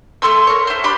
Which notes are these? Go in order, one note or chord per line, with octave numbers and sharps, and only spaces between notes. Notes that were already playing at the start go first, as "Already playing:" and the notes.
A3 A4 C6 E6
A#4 C#5
E4 C5
D4 G4 B5 C6